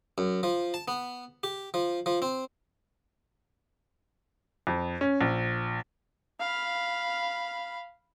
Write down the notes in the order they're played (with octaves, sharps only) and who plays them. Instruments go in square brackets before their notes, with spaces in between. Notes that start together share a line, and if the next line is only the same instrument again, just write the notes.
[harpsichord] F#2
F3
A5
B3
G4
F3
F3
C4
[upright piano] F2
C#4
A#1
[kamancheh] F5 B5